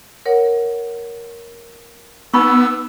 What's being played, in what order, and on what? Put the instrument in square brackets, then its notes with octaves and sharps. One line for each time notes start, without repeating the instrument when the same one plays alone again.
[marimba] A#4 C#5 F#5
[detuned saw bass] B3 [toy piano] D#4 B5 C#6 [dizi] E6